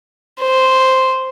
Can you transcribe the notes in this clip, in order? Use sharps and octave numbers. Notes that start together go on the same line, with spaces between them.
C5